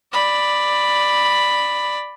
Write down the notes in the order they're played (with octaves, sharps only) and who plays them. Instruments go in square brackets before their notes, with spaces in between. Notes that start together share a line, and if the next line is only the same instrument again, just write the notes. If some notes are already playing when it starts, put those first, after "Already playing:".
[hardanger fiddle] D5 B5